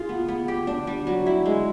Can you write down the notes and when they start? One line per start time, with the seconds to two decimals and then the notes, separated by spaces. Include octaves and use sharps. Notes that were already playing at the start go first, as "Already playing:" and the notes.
Already playing: F4 G#4
0.09 B3
0.28 B3
0.48 G4
0.67 D4
0.87 G3
1.07 F#3
1.26 E4
1.46 G#3